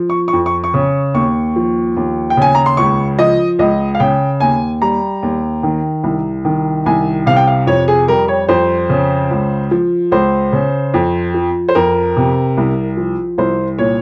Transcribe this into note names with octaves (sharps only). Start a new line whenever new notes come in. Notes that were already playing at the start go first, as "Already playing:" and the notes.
Already playing: F3
C#6
C#6
F2
C#6
C#6
C#3
D#2 C#6
F3
D#2
G5
C#3 G#5
A#5
C6
C#2 C#6
F3 D#5
C#2 D#5
F5
C#3 G5
D#2 G#5
G3 A#5
D#2
D#3
C2
D#3
C2 G#5
C3 F5
G5
F5
F2 C#5
G#4
G3 A#4
C#5
F2 C5
C#3
C#2
F3
C#2 C5
C#3
F2
F3
C5
F2 A#4
C3
C2
F3
C2 C5
A#2 C#5